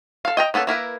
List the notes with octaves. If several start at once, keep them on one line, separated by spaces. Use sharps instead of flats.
A4 F5
D#5 G5 A#5
A#3 B3 C#4 A4
A#3 E4 A#4 B4